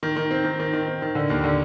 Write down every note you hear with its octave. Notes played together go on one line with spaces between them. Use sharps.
D#3
D#3
C4
D#3
D#3
D#3
C4
D#3
D3
D#2
D3